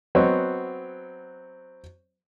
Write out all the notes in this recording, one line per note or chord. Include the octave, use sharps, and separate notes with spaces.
F#3 B3 C4 C#5 D#5